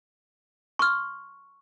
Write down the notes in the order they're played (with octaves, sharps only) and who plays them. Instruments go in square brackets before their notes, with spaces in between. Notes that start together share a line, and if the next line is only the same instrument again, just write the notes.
[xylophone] C6 F6 [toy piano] C#6